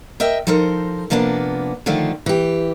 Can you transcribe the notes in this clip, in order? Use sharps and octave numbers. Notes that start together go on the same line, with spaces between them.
A#4 D#5 E5 G5
F3 D#4 A4 A#4 C5
C3 F3 A#3 B3 C#4 D4
D3 D#3 F3 A3 F4
E3 G4